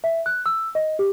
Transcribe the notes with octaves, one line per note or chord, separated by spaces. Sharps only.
E5
F#6
E6
D#5
G4